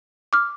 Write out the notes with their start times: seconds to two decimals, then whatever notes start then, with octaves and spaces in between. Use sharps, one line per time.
0.33 D6 F6